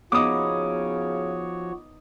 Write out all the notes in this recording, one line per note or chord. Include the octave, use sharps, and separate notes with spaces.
C#3 F3 B3 D#4 F#4 C#5 D6 D#6